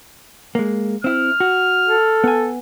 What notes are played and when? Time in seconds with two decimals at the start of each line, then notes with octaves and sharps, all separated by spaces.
0.55 G#3 A#3
1.04 C4 E4 F6
1.40 F#4
1.88 A4
2.24 B3 G#5